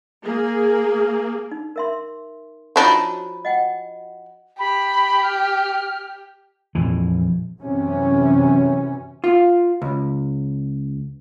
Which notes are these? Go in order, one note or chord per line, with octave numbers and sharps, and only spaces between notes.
A#3 G#4
D#4
A#4 E5 C6
F3 D4 D#4 F#4 C#5 B5
D#5 F#5 G5
G4 B5
F6
A#1 F2 E3
F#2 C3 E3 C#4
F4
C#2